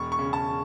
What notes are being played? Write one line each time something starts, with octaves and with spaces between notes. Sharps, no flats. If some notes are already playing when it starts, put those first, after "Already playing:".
Already playing: E1 C#6
C#6
C#3
A5